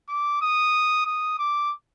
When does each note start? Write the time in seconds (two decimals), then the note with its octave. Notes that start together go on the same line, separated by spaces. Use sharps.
0.09 D6
0.42 D#6
1.06 D#6
1.39 D6